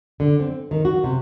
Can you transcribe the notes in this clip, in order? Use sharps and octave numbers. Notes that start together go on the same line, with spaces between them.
D3
C4
D#3
F#4
C3